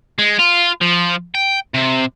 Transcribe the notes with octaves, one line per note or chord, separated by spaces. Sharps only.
G#3
F4
F3
G5
C3